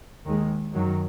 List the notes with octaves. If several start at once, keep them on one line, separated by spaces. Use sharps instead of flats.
D#2 D#3 G#3
F#2 D#3 F#3